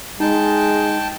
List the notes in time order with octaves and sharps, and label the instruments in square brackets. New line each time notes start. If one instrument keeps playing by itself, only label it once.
[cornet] G#3 [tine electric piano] D#4 [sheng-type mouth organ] G5 A5